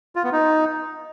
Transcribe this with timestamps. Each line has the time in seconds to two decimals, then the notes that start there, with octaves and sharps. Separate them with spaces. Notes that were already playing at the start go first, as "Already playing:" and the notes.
0.16 F4
0.24 B3
0.32 D#4